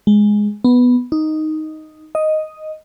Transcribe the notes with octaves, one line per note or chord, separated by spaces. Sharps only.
G#3
B3
D#4
D#5